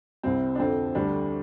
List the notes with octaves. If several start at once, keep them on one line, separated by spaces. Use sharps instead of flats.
C2 C3 G3 C4
D4
F2 D3 F3 C4
D2 D3 G3 D4